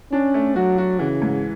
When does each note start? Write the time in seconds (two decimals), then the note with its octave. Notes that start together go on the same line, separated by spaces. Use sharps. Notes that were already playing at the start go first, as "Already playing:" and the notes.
0.12 C#4 D4
0.34 A3
0.56 F#3 F#4
0.78 F#4
0.99 C#3 E3
1.22 G#2